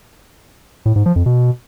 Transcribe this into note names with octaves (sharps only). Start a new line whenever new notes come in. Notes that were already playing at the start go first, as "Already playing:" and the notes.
A2
G#2
F3
F2
B2